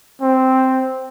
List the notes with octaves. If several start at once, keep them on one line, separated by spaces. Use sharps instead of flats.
C4